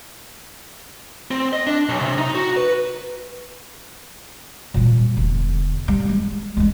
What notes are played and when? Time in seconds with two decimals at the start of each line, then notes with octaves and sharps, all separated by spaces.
1.31 C4
1.53 D#5
1.67 D4
1.89 B1
2.01 C3
2.18 D#4
2.35 F#4
2.57 B4
4.74 A#2 G3
5.17 E1 D3
5.88 G3
6.09 G#3
6.57 G#3 D4